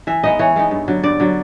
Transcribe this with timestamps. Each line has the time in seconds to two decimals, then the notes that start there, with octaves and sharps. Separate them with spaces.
0.07 E3 E5
0.24 G#3 B3 D#4 D#5
0.39 E3 C#5
0.56 G#3 B3 D#4
0.71 G2
0.88 D3 F#3
1.03 G2 D5
1.20 D3 F#3